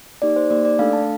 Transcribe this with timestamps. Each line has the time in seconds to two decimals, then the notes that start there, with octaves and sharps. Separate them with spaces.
0.22 A#3 D#4 G4 D5
0.36 C5
0.51 A#3 D#4 G4 D5
0.65 D5
0.79 A3 D4 A4 F5
0.93 A5